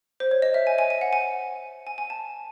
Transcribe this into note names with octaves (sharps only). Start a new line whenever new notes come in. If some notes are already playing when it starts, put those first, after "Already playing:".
C5
C#5
D#5
E5
G#5
G#5
G#5
F#5
G#5
G#5
G#5
A5